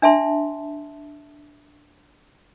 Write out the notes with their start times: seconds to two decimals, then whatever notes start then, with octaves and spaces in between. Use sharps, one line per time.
0.02 D4 E5 A5 C6